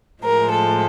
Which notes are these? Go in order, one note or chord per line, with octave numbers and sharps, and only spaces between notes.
A2 F3 G#3 A#4
A4